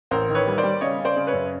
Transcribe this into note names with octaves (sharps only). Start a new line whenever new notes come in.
A1 A#4 C5
D#3
B4 C#5
G3
C5 D5
G3
C#3 C#5 D#5
C#3
C5 D5
C#3
B4 C#5
F#2